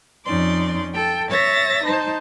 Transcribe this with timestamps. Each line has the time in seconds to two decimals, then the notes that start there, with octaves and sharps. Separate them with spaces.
0.24 F2 C#4 D#4 D5 C6
0.94 A4 G5
1.29 C#5 E5 A6 A#6
1.84 D#4 C5 A5